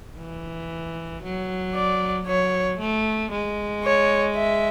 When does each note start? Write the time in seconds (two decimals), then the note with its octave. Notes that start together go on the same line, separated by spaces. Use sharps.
0.18 E3
1.23 F#3
1.74 D5
2.26 F#3 C#5
2.79 A3
3.31 G#3
3.84 C#5
4.36 E5